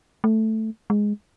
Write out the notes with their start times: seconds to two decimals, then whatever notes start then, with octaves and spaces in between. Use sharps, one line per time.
0.24 A3
0.90 G#3